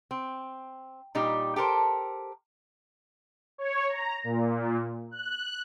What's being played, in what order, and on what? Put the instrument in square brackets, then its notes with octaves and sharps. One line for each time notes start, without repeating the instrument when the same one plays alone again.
[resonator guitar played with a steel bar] C4
A#2 G3 D#4 G4
G4 A4 A#4 C5
[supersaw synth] C#5
A#5
A#2
F#6